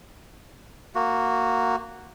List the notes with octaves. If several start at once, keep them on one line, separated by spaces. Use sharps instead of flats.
A#3 F#4